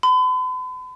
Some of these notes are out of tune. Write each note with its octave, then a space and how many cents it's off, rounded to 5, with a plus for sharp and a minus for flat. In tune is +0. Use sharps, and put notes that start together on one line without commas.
B5 +45